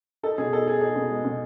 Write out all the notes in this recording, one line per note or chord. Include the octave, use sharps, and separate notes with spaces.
D#4 A4
B2 G#4
D#4 A4
D#4 G#4
D#4 G#4
B2
G#3
B2